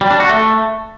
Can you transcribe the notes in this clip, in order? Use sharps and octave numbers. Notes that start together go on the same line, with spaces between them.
G3
D4
F#4
A3